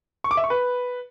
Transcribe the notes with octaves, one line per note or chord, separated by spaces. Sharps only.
C#6
D6
E5
C#6
B4